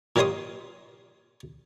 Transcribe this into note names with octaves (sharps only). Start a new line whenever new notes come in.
A#2 D#3 G4 C#5 C6 D#6